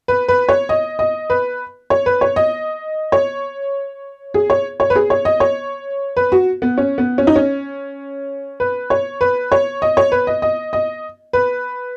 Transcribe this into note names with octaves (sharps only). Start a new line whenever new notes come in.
B4
B4
C#5
D#5
D#5
B4
C#5
B4
C#5
D#5
C#5
G#4
C#5
C#5
B4
G#4
C#5
D#5
C#5
B4
F#4
B3
C#4
B3
C#4
D#4
C#4
B4
C#5
B4
C#5
D#5
C#5
B4
D#5
D#5
D#5
B4